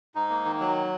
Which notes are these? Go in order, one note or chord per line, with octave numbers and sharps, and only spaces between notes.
G#2 D#4
A#3
D#3
F#3